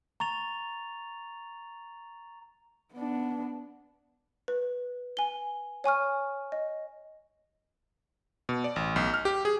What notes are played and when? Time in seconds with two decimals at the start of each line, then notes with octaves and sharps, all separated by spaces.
0.20 A#5 C#6 A6 F7
2.94 B3 D4
4.48 B4
5.17 G#5 G7
5.84 C#5 G#5 C#6 F6
6.52 D#5
8.49 B2
8.64 D5
8.76 A1
8.96 B1
9.14 F6
9.25 G4
9.45 G#4